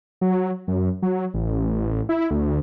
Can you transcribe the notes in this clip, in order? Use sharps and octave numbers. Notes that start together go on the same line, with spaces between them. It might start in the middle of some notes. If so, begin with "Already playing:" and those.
F#3
F#2
F#3
A1
E4
D2